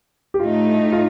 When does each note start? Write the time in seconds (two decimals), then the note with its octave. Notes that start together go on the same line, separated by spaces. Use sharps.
0.34 G4
0.40 A2 A3 D#4 F4
0.92 F4